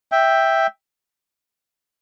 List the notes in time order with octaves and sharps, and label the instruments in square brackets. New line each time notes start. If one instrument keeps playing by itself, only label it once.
[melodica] E5 G5